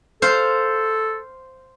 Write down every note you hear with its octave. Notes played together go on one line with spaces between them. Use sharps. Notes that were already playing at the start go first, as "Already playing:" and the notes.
A4 C5 F5